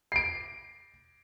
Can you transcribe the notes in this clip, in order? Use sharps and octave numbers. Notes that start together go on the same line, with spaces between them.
C7 D7